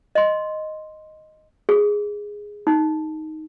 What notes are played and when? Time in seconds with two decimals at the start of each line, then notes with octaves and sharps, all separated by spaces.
0.15 D#5 C6
1.69 G#4
2.67 D#4